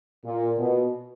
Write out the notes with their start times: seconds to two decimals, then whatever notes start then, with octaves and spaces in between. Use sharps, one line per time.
0.24 A#2
0.57 B2